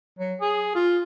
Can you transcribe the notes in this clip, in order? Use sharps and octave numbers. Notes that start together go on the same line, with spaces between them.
F#3
G#4
F4